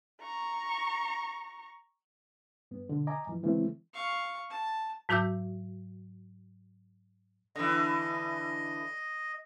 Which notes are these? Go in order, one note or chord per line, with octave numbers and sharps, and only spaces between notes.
A#5 C#6
G2 B3
B2 D3
D#5 G#5 A#5 D6
G2 E3 F3
C#3 E3 G#3 A3 C4 E4
F5 C#6
A5
G#2 F#3 F#4 D6 E6 G6
D3 E3 D#5